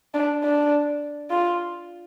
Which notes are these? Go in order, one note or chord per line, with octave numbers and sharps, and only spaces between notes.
D4
D4
F4